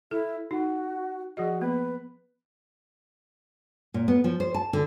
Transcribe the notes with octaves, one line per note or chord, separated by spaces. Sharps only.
E4 A4
D#4 F#4
F3 F#4 G#4 D#5
A#3 B3 B4
A#2
B3
F3
C5
A5
D3